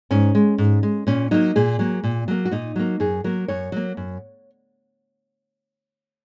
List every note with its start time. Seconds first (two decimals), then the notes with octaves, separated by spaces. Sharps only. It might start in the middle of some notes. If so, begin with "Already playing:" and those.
0.11 G#2 C#4
0.35 G#3
0.58 G#2
0.83 G#3
1.07 A#2 C#4
1.31 F#3 A#3 D#4
1.56 A#2 G#4
1.79 F#3 A#3
2.04 A#2
2.28 F#3 A#3
2.45 F#4
2.51 A#2 D#4
2.76 F#3 A#3
3.00 F#2 G#4
3.24 F#3 A#3 A#4
3.48 F#2 C#5
3.72 F#3 A#3
3.97 F#2